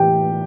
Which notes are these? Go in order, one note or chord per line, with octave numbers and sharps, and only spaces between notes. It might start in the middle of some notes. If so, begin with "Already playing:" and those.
Already playing: A2 E3 G4 G5